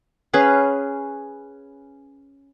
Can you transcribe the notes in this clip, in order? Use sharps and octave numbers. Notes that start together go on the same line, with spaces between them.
C#4 G#4 B4 F5